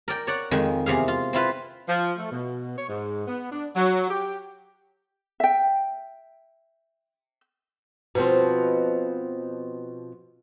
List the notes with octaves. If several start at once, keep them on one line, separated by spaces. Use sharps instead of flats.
A#4 D5 G5
C#5 D5 F#5
F2 D#3 G#3 G#5
E2 C3 G#4 F5
F4
C4 E4 F4 B4
F3
A3
B2
C#5
G#2
B3
D4
F#3
G4
E5 G5
B2 F3 C4